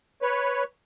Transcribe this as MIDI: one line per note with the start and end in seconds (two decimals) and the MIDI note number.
0.22 0.64 71
0.22 0.64 73